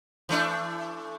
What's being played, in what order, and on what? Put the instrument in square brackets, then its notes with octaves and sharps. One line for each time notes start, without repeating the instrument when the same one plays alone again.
[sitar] E3 A3 D4